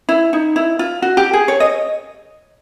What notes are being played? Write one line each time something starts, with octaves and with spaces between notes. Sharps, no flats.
E4
D#4
E4
F4
F#4
G4
G#4
C#5
D#5